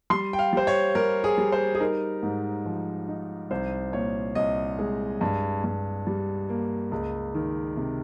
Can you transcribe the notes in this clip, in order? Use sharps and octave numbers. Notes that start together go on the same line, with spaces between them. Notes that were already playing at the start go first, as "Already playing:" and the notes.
G3 C6
G5
F5
G3 C5
C#5
G3 A#4
G#4
G3
C5
G#4
D#4 A#4
G#2
F3
D#4
C2 C5
A#2 C#5
C2 D#5
G#3
G2
G2
G3
A#3
C#2
D#3
C3